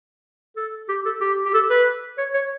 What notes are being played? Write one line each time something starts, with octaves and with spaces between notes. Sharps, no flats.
A4
G4
A4
G4
G4
A4
B4
C#5
C#5